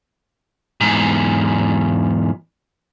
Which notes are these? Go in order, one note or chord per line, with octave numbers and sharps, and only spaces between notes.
E2 G#2